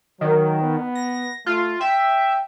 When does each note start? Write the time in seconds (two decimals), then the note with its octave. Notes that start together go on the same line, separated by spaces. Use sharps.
0.21 D#3 F#3
0.61 B3
0.95 A#6
1.46 A3 F4
1.81 E5 G5